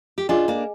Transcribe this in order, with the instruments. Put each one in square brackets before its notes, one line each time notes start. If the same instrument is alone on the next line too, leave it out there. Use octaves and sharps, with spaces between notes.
[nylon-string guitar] G4
[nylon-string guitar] D4 F4 [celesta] G#4 D#5 G#5
[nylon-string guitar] A#3 D4